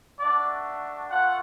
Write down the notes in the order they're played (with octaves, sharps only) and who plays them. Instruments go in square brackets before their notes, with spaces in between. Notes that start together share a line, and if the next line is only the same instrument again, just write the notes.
[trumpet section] A3 D4 F#4 D5
A3 F4 F#5